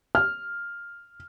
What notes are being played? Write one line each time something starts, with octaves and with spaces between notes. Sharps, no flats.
F6